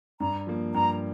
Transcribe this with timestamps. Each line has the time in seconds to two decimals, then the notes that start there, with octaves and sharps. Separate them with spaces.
0.20 G2 A#5
0.47 F3 A#3
0.74 G2 A#5